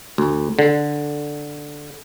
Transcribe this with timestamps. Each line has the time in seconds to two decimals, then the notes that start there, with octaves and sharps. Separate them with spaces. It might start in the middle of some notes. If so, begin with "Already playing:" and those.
0.18 D2
0.59 D3